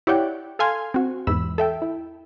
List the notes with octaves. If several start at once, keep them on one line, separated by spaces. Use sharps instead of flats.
E4 G4 C#5 D5 F#5 G5
A4 F5 G#5 C6 F6 G#6
C4 F#4
E2 G#2 B5 E6
A4 E5 G5
E4